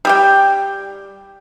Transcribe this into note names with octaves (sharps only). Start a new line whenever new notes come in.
G3 G4 G5